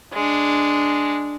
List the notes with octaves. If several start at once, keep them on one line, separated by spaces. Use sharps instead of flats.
G#3 D4